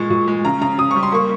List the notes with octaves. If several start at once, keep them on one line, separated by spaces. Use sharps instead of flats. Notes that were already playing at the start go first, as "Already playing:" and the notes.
Already playing: A#2 G#3 C#6
A#2
G#3
C#3 A#5
C#3 A#5
C#3 D#6
G3 C#6
C6
A#3 C#6